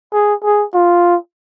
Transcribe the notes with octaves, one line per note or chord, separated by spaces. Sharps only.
G#4
G#4
F4